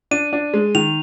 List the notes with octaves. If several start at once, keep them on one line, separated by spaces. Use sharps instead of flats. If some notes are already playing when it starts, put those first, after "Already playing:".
D4 D#7
D4
G#3
D#3 F7